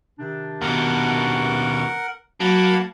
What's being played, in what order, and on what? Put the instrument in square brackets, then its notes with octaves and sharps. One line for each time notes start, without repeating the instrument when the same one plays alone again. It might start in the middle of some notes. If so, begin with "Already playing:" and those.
[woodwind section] C3 D#3 D4
[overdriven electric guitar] D#2 B2 [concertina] A#4 F#5
[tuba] F#3 [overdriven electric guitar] A#3 [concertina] F#5 A5 B5